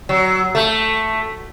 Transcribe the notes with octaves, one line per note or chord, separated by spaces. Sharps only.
F#3
A3